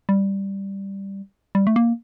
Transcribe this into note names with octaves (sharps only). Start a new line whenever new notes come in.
G3
G3
A3
A#3